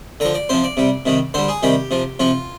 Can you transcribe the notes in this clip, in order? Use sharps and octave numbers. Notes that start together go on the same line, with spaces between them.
D3 F3 A#5
D5
C3 F3 C5
D5
C3 G3
C3 D#3 G3
D3 G3 C5
G#4
C3 D#3 G3 G4
C3 F3
C3 F3 F4